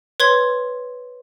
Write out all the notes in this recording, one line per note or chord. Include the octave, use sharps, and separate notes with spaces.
B4 C#5 C6 G#6 G7